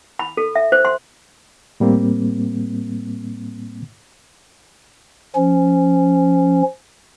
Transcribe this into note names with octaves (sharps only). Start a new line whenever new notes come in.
B5
A4
E5
C5
C6
A2 G3 A#3 C4
F3 C#4